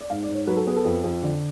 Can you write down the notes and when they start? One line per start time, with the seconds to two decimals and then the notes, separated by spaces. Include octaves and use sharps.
0.01 D5
0.10 G#2 F5
0.23 D5
0.28 G#2
0.34 C#5
0.47 F#3 B4
0.56 A4
0.67 B3 G#4
0.76 A4
0.85 F2
1.04 F2
1.23 D3